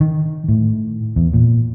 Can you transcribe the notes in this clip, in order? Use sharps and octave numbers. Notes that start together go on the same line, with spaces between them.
D#3
A2
E2
A#2